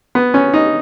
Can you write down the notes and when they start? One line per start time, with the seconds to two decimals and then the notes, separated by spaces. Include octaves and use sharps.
0.15 B3
0.34 C#4
0.54 D#4